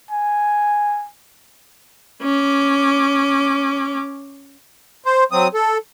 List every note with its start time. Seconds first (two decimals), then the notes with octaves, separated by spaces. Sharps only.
0.11 G#5
2.22 C#4 D6
5.04 C5
5.32 F#3 C4 D#6
5.54 A4